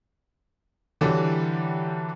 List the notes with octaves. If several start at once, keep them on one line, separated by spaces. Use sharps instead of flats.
D3 E3 F#3 G3 G4 A4